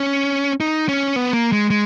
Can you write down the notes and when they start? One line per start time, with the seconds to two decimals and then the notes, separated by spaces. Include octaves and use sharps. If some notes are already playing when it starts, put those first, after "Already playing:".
Already playing: C#4
0.60 D#4
0.89 C#4
1.16 B3
1.33 A#3
1.52 G#3
1.70 G#3